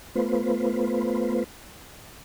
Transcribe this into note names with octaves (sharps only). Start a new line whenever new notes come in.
A3 B3 F4 B4 C5